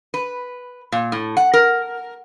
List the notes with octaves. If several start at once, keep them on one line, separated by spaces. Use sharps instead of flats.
B4
A#2
A2
F#5
A#4